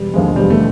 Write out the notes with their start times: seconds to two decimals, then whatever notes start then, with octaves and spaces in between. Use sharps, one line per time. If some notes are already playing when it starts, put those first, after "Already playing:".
Already playing: E1 G3
0.14 D#2 D3 F3 G#3
0.36 E1 G3
0.50 A3